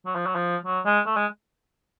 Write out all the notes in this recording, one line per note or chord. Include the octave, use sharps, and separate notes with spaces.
F#3
F3
F#3
F3
F#3
G#3
A3
G#3